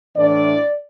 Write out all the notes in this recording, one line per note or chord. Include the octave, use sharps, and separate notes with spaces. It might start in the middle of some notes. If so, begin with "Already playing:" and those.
A2 E3 D4 D5